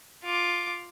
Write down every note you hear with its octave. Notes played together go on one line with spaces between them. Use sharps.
F4 D6